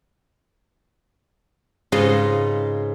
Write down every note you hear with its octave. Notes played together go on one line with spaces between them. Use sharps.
G#2 C#3 F4 B4 D#5 C6